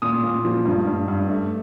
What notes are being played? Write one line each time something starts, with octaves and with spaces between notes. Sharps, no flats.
A#2 D#6
A#2
F3
G2
G2
G2
A3